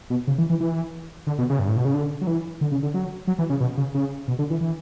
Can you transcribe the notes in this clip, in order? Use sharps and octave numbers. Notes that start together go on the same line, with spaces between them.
B2
C#3
E3
E3
E3
D3
B2
C#3
G2
A2
B2
C#3
D3
F#3
E3
D3
C#3
D3
F#3
F#3
E3
C#3
B2
C#3
C#3
B2
D3
E3
E3